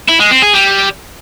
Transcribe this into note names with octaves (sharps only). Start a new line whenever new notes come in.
E4
G#3
C4
G#4
G3